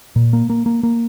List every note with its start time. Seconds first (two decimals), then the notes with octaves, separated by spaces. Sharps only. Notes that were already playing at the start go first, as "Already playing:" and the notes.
0.16 A#2
0.33 A#3
0.50 A#3
0.66 A#3
0.83 A#3